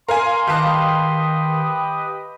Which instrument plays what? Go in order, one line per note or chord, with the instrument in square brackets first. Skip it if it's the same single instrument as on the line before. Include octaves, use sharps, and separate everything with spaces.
[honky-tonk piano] A#4 F5 G#5 [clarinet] C6
[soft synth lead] D#3 [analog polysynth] G4 B4 D#5 [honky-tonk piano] F5 A5